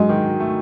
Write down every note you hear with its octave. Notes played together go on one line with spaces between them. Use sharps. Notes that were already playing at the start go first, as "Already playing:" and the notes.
Already playing: G#2 F#3 G#3
D#3
A3